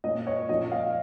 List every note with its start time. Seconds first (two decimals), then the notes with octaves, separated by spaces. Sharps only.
0.04 A#2 A#3 C#4 D#5
0.27 C#5
0.49 A#2 F3 C#4 D#5
0.72 F5